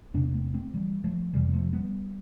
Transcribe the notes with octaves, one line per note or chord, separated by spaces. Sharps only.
E2 C3 B3 D4
B3
A3 C4
A3 C4
E3 G3
F3 A3
F2 C3 E3 G3
B3
F3 A3
G3 B3